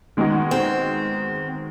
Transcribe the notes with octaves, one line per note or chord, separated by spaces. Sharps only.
D#3 G#3 B3 D#4 F#4
C4